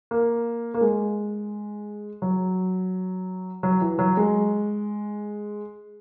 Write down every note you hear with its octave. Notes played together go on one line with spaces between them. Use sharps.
A#3
A#3
G#3
F#3
F#3
E3
F#3
G#3